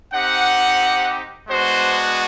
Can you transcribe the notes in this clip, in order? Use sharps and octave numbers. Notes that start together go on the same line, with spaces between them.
C4 D#4 G4 F#5
G#3 B3 D4 F#4 C5